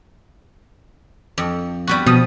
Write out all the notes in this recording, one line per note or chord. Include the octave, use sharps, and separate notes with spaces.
F2
G3 B3 F#4
B2 F3 D#6